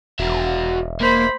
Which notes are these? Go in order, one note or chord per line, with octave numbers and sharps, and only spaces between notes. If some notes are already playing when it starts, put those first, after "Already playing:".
E1 F#4 E5
A#3 C5 B5